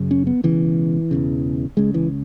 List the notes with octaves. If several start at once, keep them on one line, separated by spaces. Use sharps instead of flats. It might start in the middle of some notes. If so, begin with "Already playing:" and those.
Already playing: F#1 F#2 C#3
C#4
B3
E1 E2 C#3 E3
E1 E2 C#3
C#2 C#3 G#3
E3